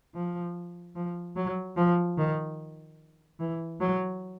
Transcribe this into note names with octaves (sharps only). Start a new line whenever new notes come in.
F3
F3
F#3
F3
D#3
E3
F#3